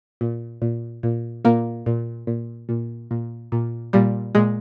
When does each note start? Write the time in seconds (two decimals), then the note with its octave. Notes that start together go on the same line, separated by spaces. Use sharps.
0.21 A#2
0.62 A#2
1.03 A#2
1.45 A#2 A#3
1.86 A#2
2.27 A#2
2.69 A#2
3.11 A#2
3.52 A#2
3.93 A#2 G3
4.35 A#2 G#3